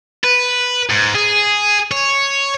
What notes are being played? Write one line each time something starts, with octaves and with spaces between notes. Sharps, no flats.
B4
G#2
G#4
C#5